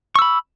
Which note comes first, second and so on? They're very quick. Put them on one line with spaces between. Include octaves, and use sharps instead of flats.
C#6 E6 B5